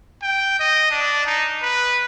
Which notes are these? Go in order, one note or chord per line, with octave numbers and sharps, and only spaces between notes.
G5
D#5
D4
D#4
B4